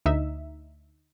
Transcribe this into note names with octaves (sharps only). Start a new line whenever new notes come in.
D2 D#4 E5